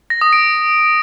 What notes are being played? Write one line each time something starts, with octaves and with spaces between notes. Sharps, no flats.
A#6
D#6
D7